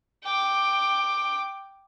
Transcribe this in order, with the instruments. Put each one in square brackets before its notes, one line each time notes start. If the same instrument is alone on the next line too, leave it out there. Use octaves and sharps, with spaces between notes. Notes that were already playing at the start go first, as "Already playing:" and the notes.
[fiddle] G5 D6